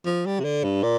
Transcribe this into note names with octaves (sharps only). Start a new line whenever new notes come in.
F3
G3
C3
D3
G2
A#2